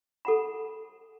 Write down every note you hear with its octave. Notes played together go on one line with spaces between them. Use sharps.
A4 F#5 B5